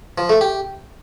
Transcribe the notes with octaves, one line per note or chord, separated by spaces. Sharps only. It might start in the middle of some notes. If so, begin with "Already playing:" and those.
F3
A3
G4